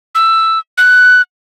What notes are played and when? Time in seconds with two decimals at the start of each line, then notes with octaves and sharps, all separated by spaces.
0.15 E6
0.78 F#6